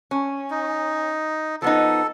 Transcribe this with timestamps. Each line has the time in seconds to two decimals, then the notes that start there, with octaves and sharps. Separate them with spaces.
0.11 C#4
0.51 D#4
1.62 F3 B3 D#4 A4